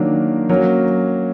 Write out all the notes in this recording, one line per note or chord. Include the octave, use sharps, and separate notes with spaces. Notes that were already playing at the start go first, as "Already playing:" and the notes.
Already playing: D#3 F#3 A#3 D4
F#3 A#3 C#4 F#4